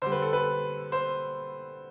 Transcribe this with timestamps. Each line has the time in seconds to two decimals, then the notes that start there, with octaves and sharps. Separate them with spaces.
0.02 D3 G3 C5
0.12 B4
0.22 A4
0.33 B4
0.92 C5